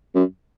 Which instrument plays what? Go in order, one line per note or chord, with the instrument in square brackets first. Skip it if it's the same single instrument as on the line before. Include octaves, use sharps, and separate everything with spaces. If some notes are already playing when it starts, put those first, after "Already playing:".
[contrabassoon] F#2